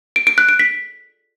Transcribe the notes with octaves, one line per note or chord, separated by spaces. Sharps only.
D7
D7
F#6
D7
B6